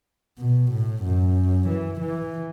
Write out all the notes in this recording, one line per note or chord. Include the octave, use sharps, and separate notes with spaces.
B2
A2
F#2
E3
E3